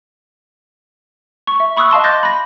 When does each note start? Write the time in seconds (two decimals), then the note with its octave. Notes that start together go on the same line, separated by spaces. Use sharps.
1.47 C#6
1.60 E5
1.77 B5 C#6 D#6 E6 F#6
1.91 D#5 F5 A5 C6
2.04 C6 D6 F#6 G6 A6 A#6
2.23 B5 A#6